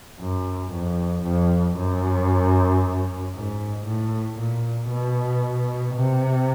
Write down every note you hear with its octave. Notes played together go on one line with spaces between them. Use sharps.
F#2
F2
F2
F#2
G#2
A2
A#2
B2
C3